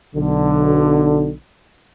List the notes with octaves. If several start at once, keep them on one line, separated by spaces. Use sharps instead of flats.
B1 D3